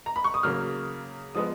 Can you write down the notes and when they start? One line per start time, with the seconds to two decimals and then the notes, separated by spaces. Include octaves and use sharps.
0.06 A#5
0.16 B5
0.24 C#6
0.34 D#6
0.43 C#3 F#3 A#3 F6
1.35 F3 G#3 B3 D#6